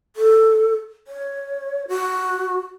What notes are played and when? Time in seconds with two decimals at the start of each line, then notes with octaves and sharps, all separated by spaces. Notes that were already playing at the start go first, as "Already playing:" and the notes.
0.16 A4
1.08 C#5
1.88 F#4